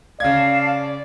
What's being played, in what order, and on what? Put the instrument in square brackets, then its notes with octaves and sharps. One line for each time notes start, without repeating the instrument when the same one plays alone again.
[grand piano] C#3 G#6 [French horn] D5 [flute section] F5 A5